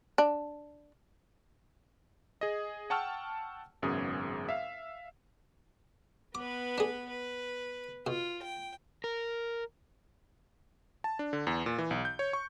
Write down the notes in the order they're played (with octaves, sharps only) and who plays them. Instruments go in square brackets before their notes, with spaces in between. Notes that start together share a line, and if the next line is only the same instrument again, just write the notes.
[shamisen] D4
[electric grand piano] G#4 D#5
F#5 G5 A5 C#6 E6 F6
G#1 F#2 C#3 B3 G#4 D#6
E5 F5
[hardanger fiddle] B3 B4 [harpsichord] D6
[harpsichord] D4 G#4
[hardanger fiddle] B4
[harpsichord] B2 [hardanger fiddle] F4
[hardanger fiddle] G5
[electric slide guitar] A#4
[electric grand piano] A5
D4
D3
E2
A#2
E3
B1
G6
C#5
C#6